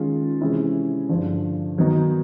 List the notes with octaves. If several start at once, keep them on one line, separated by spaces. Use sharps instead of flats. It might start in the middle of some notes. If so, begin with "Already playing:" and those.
Already playing: D#3 G#3 C#4 F4
C3 E3 G#3 C#4 E4
G2 D3 F3
D#3 F#3 B3 D#4